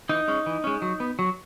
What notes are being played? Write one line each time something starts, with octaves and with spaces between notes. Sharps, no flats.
E3 D#4
G#3 C#4
E3
G#3 C#4
F#3
B3
F#3